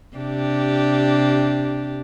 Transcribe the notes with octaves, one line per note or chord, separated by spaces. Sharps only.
C3 D4 G4